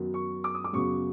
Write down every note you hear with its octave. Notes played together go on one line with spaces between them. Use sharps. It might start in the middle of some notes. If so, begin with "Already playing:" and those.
Already playing: F#2 D#3 F#3 B3
C#6
D6
D#6
D6
F#2 C#3 F#3 B3 C#6